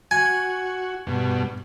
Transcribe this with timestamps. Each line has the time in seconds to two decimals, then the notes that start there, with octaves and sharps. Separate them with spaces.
0.11 F#4 G#5
1.07 G2 B2